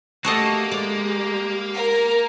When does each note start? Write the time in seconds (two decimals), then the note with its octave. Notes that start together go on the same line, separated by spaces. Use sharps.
0.25 A3 A#3 F#4 G4 A4 D#5
0.71 G#3 G4 D5
1.74 A#4